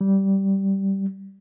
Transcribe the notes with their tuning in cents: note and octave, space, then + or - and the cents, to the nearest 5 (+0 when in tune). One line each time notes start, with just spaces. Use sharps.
G3 -10